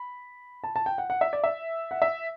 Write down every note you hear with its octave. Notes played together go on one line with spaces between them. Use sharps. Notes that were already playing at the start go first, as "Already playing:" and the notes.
Already playing: B5
A5
A5
G5
F#5
F#5
E5
D5
E5
F#5
E5